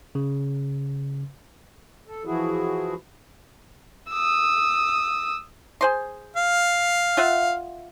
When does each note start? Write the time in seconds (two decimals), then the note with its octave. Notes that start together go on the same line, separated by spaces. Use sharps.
0.15 C#3
2.07 A4
2.25 E3 F3 E4 F#4 G#4
4.11 D#6 E6
5.81 G#4 C5 C6
6.36 F5
7.17 F4 E5 F#5